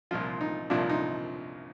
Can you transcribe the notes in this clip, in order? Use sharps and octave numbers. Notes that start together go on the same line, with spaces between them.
C2 A#2 F3 F4
D#4
C2 A#2 F3 D4
D#4